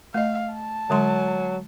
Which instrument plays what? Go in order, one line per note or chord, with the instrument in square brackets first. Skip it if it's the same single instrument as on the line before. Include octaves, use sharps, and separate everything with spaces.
[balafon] A3 D#5 [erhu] F5
[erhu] A5
[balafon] D3 G#3 C6 [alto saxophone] F#3